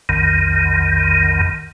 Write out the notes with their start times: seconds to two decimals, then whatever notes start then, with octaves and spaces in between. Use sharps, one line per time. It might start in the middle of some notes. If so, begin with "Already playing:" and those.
0.09 B1 F2 D#3